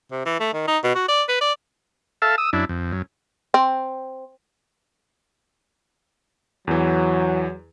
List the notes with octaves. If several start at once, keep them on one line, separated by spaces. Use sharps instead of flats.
C3
E3
A3
D#3
D#4
B2
F#4
D5
B4
D5
A4 E5 F5 A5
D#6 E6
F#2 D4 E4
F2
F#2
C4
E2 E3 F#3